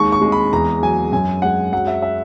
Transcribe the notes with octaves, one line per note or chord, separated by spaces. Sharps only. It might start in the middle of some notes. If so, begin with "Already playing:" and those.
Already playing: D#2 G#3 C#6
C#6
G#3
B5
E2 A#5
F#3 G#5
F#2 G#5
G#3 F#5
F#3 F#5
E5
E5